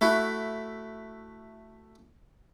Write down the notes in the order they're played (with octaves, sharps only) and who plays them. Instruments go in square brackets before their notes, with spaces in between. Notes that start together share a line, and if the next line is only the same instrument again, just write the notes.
[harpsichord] A3 E4 F#4